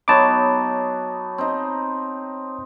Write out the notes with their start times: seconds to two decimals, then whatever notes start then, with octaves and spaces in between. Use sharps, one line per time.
0.08 F#3 B3 D#4 C#5 A5 D6
1.38 C4 D#4